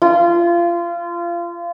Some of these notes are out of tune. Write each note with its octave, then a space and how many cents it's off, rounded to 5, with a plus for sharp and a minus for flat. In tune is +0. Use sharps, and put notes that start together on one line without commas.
F4 -25